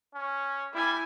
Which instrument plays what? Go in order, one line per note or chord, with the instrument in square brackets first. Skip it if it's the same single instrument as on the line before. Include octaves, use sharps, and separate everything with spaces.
[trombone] C#4
[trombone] G3 [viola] E4 G#5